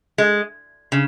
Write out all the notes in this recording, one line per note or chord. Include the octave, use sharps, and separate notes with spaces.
G#3
C#3